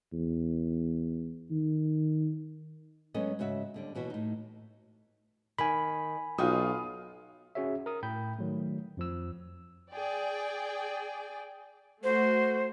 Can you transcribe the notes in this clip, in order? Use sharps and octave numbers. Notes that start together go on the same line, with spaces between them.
E2
D#3
F#3 G#3 B3 C#4 A4 D#5
G#2 C#3 F#4 E5
D#2 D3 G3
D#2 B2 E3 F#4
A2 D#4
D#3 G#5 B5
B1 F4 F#4 D#5 G5 D#6
C#4 F#4 G#4 C#5 E5
A#4 D#6
A2 G5 B5 G6
D#3 F#3 A3
F2 F3 E6
G#4 D5 G5
A3 F#4 C5